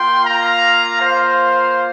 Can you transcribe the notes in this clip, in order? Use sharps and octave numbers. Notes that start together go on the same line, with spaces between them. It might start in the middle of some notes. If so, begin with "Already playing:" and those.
Already playing: A#3 F4 G5 C6
F5 A#5
C5 F5